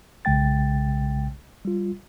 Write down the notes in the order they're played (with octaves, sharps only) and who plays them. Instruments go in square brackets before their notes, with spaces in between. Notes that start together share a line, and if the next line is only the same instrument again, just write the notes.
[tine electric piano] B1 C#3 G#3 G5 A6
G3 F4